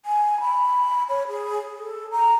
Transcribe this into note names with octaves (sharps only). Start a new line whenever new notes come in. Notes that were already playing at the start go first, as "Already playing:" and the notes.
G#5
B5
C#5
G#4
A4
A#5